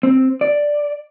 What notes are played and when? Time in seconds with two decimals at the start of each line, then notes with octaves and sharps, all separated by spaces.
0.03 C4
0.41 D5